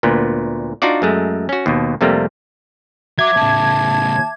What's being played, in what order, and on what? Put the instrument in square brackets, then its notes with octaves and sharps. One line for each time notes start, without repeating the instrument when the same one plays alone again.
[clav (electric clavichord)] D2 A#2 B3
D4 D#4 F4 F#4 D5
F#2 G#3 A3
C#4 F#4
D#2 B2
F2 C3 G3 A3 A#3
[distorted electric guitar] F#3 [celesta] E5 D6 [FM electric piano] G#6
[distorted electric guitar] A2 C#3 [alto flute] A5